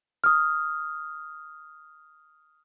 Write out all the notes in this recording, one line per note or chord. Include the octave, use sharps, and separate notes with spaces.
D#6 F6